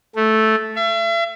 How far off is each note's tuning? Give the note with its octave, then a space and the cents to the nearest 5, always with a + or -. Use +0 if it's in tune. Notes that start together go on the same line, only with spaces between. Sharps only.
A3 -5
E5 +40